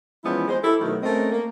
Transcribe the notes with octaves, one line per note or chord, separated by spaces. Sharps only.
E3 F3 G#3 B3 C#4 E4
G#3 C5
E4 G4 A4
B2 D#3 F#3 A3
A3 C4 C#4 A#4 D#5
A#3